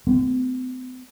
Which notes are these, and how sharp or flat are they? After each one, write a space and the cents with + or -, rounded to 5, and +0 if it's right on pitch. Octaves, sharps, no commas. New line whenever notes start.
A3 +5 C4 -45